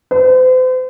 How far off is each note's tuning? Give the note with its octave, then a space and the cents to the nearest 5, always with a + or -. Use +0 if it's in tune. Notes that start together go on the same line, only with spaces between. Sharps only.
C5 -40